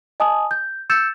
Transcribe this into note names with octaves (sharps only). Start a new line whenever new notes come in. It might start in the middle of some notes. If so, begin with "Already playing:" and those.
D#5 G#5 A5 D#6
G6
E6 G6 A6 C#7 E7